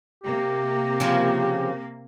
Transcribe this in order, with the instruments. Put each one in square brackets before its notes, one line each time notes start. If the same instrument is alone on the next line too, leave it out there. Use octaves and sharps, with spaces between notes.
[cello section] C3 A#3 [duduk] G4
[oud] C#3 F3 F4